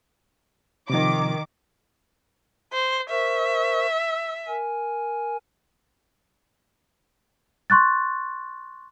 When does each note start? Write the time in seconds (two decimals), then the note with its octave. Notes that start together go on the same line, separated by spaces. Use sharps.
0.90 C3 D#3 F3 D6
2.72 C5
3.10 A#4 C5 E5 C#6
3.98 E6
4.47 A#4 G#5
7.70 C6 C#6 F#6 A6